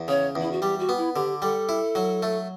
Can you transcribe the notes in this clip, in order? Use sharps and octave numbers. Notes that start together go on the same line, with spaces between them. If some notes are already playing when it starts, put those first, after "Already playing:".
Already playing: E2
C#3 C#5
E2
E4
F#4
G3 G4
F#4
B3
E4
D3 G4
G3 A4
E4
F#3
A3